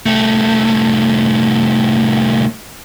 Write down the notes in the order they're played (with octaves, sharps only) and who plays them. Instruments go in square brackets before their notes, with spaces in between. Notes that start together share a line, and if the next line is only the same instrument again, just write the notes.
[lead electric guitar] C2 A3